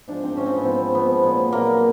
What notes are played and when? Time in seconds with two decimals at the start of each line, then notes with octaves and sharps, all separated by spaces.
0.08 G#2 F3 D4
0.23 C4
0.37 G#2 F3 C#4
0.46 C4
0.56 B3
0.64 G#2 F3 C4
0.94 G#2 F3 B3
1.23 A#2 F#3
1.51 A#2 F#3 A#3